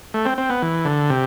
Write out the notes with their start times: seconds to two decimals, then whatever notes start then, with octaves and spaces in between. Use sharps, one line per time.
0.14 A3
0.26 C4
0.38 C4
0.50 B3
0.62 E3
0.85 D3
1.10 C3